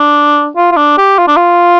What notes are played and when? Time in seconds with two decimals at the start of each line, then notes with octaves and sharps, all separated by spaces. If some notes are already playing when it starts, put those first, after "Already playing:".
Already playing: D4
0.57 F4
0.72 F4
0.77 D4
0.98 G4
1.19 F4
1.28 D4
1.37 F4